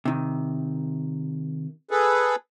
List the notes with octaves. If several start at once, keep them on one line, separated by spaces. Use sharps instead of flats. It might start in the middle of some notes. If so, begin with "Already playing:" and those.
C3 D#3
G#4 A4 B4